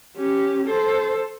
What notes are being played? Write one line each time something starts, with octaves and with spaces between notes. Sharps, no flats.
C#4 G4
A4 C5